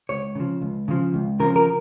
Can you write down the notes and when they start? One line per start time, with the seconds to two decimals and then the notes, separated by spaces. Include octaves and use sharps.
0.09 C#2 C#5
0.35 C#3 F3
0.61 C#2
0.88 C#3 F3
1.14 C#2
1.40 C#3 F3 A#4
1.56 A#4